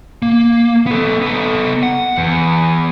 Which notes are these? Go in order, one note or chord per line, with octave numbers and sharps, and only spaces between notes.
A#3
B3 A4
B3 A4
F#5
E2